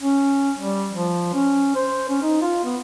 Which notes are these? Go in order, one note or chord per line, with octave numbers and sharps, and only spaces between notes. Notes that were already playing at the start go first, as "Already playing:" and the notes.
C#4
G3
F3
C#4
C5
C#4
D#4
F4
B3